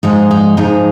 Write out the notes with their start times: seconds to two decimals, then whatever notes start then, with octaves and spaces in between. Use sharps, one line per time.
0.03 G#2 F3 G#3 D#4
0.31 D#4
0.57 G#2 F3 G#3 D#4